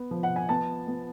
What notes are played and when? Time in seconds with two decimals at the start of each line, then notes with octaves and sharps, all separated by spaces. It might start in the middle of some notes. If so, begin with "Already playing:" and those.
Already playing: B3
0.11 F3
0.23 F#5
0.36 G#5
0.49 B3 A5
0.87 B3